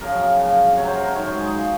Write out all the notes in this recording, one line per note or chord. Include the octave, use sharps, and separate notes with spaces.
F#2 C#3 F3 A#4
A#2 F3
C3 F#3 C#5
C5
A#4
C5
G#2 D#3 F#3 C#5
C5
G#4
F3